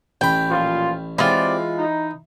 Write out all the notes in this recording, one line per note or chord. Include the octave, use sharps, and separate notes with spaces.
A1 G5 B5
A#2 F3 F4
E3 G#3 C4 F4 G4 D5
D#4